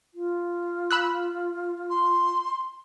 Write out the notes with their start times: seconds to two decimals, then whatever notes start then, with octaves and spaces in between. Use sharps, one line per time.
0.14 F4
0.91 B5 E6 F#6
1.90 C6